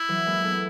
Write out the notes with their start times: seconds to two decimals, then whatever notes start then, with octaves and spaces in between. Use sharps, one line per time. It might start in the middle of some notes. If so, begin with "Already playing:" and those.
Already playing: E4
0.09 E3 F#3
0.26 G#3 A#3
0.44 A3 B3